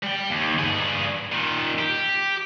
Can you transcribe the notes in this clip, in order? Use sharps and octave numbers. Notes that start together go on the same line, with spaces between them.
G3 G5
D#2
G2 G#4
A#2 D#3
G4